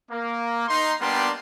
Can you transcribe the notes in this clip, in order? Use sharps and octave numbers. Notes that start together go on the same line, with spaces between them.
A#3
D#4 C6
G3 A#3 B3 D4 G5 C6